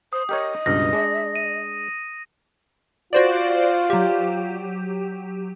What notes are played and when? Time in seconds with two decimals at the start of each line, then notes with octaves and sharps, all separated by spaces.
0.13 C5 D#6
0.29 G4 A#4 C#5 D#5
0.66 C#2 G2 B2 A#6
0.93 G#3 D4
1.36 D#7
3.13 F4 F#4 C5 D5
3.90 F#3 G4